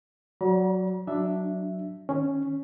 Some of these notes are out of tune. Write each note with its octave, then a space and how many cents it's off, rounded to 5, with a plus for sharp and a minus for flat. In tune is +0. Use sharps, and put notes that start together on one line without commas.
F#3 +0 D5 -25 A#5 +45
F#3 +0 D4 +0 E5 +0
D#3 +0 C#4 +0